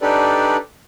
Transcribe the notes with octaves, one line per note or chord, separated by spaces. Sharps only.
D4 D#4 G4 A4 B4 D5